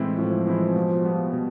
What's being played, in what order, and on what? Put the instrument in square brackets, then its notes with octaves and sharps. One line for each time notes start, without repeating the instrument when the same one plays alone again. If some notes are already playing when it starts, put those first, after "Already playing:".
Already playing: [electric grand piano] A2 E3 G#3 C4 E4
[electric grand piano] A2 [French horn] F3
[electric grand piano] E3 G#3 C4 E4
B2
G3 B3
B2